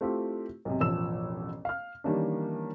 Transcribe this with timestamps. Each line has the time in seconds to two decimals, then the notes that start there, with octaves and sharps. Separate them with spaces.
0.01 A3 C4 E4 F4 G4
0.65 B1 G#2 C3
0.80 E1 A1 F3 E6 E7
1.65 F5 F6
2.04 D#3 E3 G3 A#3 C#4 D4